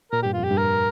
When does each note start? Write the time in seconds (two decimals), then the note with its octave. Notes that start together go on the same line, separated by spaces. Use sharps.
0.12 A#2 A#4
0.23 G2 G4
0.33 F2 F4
0.44 G4
0.51 G2
0.57 A#4